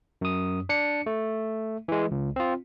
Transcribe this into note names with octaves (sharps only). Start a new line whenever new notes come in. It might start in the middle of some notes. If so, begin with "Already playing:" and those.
F#2 D#6
D4 C#7
A3
E3 G#3
C#2
C4 F4